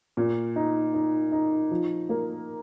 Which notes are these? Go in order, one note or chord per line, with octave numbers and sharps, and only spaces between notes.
A#2
D#4
D#4
D#4
F3
A#3